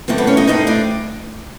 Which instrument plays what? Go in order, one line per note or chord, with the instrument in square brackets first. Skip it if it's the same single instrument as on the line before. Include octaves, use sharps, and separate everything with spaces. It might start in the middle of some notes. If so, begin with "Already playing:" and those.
[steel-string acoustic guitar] G2 E3 A3 C4
B3 B4
C#4 C#5
D#4 D#5
G2 E3 A3 C4 D#4 D#5
D4 D5